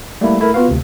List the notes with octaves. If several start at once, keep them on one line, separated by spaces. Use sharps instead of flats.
G3 A3 A#3 E4
A3 E4 A4 A#4
B3 F4 F#4 B4 F5
D2 C3